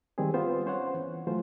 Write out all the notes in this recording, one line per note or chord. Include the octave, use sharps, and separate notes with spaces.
D#3 G3 C4 G4 G#4
B3 C4 F4 C5
C#4 C5 C#5 F#5
E3
E3 F#3 A3 F4 C5